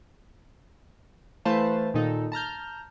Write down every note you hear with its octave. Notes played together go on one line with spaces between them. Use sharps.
E3 A3 B4 C5 F5 A5
A#2 D#3 D#4 A4
A5 A#5 F6 G6